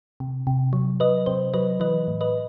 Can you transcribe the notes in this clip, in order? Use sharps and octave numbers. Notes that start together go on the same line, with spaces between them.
C3
C3
F#3
F#3 B4 D#5
C3 C5
F#3 B4 D#5
E3 B4 D#5
A2
B4 D#5